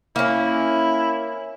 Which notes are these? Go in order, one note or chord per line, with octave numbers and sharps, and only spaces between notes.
A#3 C#4 E4